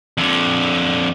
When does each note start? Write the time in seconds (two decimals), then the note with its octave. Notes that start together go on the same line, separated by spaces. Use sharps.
0.18 F2 D3